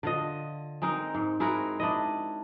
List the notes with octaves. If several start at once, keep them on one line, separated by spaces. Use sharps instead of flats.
D3 F4 D#5
G#3 C4 D#4 A#4
G#2
G#3 E4 F#4 A#4
D4 E4 D#5